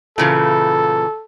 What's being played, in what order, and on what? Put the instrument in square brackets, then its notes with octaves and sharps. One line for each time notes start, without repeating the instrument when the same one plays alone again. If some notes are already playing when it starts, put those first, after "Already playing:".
[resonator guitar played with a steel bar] A#2 C#3 E3 [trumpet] A4